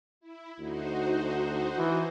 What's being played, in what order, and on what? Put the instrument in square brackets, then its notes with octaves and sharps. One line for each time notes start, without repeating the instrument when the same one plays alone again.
[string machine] E4
[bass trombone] D2 [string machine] D#4 F#4 C5
[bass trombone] E3